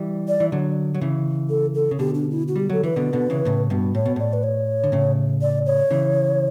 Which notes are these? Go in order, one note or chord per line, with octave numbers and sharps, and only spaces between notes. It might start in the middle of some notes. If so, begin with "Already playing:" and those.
Already playing: E3 G3
D5
E3
D3 F#3
F#3
C#3 E3
A4
A4
C#3
B2 D3 G4
D4
E4
F#4
G3 G4
F#3 A4
E3 B4
B2 D3
B2 D3
C#3 E3
A2 C#3
G2 B2
A2 C#5
B2
A2 D5
B4
C#5
D3
A2 C#3
D5
C#5
C#3 E3